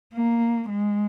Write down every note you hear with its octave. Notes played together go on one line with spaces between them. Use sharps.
A#3
G#3